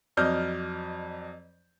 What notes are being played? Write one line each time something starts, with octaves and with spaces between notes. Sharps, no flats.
F2 F#3 D5 D#5 F6 G6